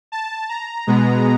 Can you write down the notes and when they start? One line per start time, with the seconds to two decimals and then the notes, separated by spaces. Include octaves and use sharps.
0.12 A5
0.49 A#5
0.87 B2 G#3 B3